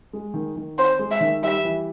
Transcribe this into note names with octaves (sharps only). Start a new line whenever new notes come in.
G#3
D#3
D#3
C4 C5
G#3
E5
D#3
G3 E5
E3